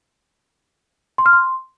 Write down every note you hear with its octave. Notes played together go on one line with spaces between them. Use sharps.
C6
F6
C6